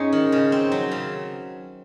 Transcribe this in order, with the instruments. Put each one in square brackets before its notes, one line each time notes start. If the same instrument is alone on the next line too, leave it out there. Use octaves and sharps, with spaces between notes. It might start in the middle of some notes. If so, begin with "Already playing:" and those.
Already playing: [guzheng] G#2 G#3 C4 D#4 [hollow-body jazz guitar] C#4
[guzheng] D#3
C#3
C4
F#3
C#3